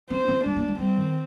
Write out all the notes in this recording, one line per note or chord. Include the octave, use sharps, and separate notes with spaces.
C4 C5
C4
G#3 D4
A#3
G#3
G3 C4
D#3